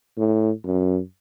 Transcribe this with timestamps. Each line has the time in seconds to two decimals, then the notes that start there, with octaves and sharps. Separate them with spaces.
0.17 A2
0.65 F#2